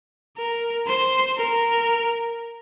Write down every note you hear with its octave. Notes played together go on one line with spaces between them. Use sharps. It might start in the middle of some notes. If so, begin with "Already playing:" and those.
A#4
C5
A#4